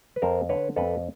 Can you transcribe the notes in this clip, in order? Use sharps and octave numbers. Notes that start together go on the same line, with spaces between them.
B4
F2 A#4 C5
D3 B4 C#5
F2 A4 B4